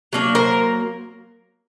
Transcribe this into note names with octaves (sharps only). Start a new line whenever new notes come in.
F#3 A#3 D4
A#4 C5